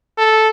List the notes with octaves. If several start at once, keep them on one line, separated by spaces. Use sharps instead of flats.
A4